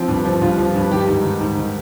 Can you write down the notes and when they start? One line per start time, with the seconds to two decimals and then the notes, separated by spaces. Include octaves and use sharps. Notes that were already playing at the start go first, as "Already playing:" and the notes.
Already playing: F3 C4
0.08 G2
0.25 F3
0.41 G2 F4
0.58 F3
0.75 G2
0.91 D#3 G4
1.07 G#2
1.24 D#3
1.41 G#2
1.56 D#3